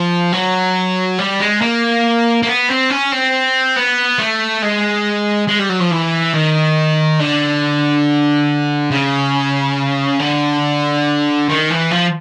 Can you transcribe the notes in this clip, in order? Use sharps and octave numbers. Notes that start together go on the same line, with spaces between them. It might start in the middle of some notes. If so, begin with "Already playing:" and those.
Already playing: F3
F#3
G3
G#3
A#3
A#3
B3
C4
C#4
C4
B3
A3
G#3
G#3
G3
F#3
F3
E3
D#3
D3
C#3
D3
D#3
E3
F3